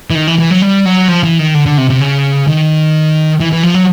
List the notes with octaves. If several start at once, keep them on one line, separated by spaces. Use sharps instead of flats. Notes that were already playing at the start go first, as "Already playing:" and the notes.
E3
D#3
E3
E3
F#3
G3
F#3
F3
E3
D#3
D3
D3
C3
C3
C#3
D#3
E3
E3
F3
F#3